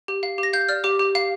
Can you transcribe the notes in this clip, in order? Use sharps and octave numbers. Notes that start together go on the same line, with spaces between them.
G4
F5
G4
A#6
F5 G6
D5 F6
G4 D6
G4
F5